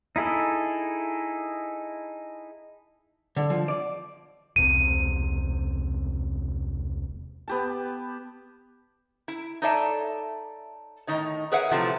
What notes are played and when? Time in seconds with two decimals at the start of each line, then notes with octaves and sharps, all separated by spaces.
0.16 D#4 E4 G#4 A4
3.36 D3
3.50 F3
3.68 D5
4.56 E1 C2 C3 D#7
7.48 B3 G4 A5
9.28 E4
9.62 D#4 A4 C#5 D5 E5 A5
11.07 A2 D#3 D#4 C#5
11.52 G#4 A#4 B4 C#5 E5 F#5
11.71 C3 F3 F#3 A3 E4